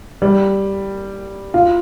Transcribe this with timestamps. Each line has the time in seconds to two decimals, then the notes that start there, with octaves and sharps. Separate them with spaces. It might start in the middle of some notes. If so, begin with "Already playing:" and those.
0.22 G3
1.54 F4